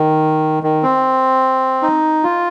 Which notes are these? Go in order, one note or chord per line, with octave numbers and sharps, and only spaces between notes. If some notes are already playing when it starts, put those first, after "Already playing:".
Already playing: D#3
D#3
C4
D#4
F4